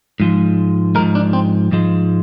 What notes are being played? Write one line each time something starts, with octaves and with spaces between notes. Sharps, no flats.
G#2 F3 G#3
G#2 F3 G#3 A#4
D4
C4
G#2 F3 G#3